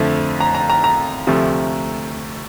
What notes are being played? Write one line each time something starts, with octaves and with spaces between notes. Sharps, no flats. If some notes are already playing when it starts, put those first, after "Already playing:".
Already playing: F2 D3 F3 A3 C4
A#5
A#5
A#5
A#5
D2 C3 F3 A3